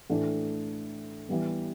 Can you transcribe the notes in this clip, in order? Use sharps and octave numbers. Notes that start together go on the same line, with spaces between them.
A2 E3 A3 D4
E3 G3 B3